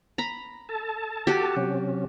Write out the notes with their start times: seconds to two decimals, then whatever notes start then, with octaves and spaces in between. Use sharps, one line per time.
0.18 A#5 B5
0.69 A4 A5
1.27 F#4 G4
1.57 C3 F#3 C#4